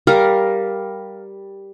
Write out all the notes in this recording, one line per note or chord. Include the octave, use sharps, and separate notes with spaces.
G3 A#4 F5